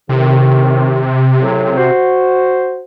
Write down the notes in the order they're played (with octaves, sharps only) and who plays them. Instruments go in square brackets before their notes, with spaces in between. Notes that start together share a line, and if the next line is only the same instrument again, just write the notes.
[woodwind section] D#2 A2 D#3 [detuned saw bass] C3
[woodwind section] A2 C#3 F#3
F#4 C5